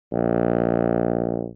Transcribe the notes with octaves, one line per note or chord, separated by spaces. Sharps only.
A#1